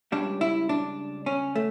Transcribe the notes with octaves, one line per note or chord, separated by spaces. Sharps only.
C#2 C#3 G3 D4
E4
D4
C#4
A3